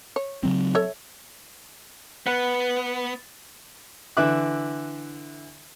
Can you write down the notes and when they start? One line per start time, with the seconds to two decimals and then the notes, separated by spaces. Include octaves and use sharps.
0.16 C#5
0.43 C#3 F#3 C4
0.75 A4 C#5 E5
2.27 B3 B4 F#5
4.17 D3 E3 E5 D6 F#6